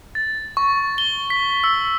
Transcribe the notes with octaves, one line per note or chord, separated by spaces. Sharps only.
A6
C#6
G7
B6
E6